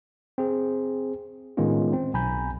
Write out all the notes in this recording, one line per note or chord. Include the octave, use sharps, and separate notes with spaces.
C4 G#4
A2 D#3 G#3 B3 C#4 F4
C4
B1 G#5 A#5 B5 G6